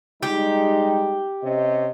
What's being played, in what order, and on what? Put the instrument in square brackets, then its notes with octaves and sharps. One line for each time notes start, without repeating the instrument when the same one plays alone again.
[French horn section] G3 G#3 D#4 [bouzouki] G4
[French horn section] C3 C#4 D#5